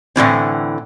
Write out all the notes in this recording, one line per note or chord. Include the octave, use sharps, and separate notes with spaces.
A2 D3 E3 C4